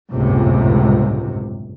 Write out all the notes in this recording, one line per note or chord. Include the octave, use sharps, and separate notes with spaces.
G1 C#2 F#2 A2 C3